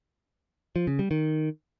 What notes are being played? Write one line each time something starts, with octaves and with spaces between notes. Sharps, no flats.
F3
C#3
G3
D#3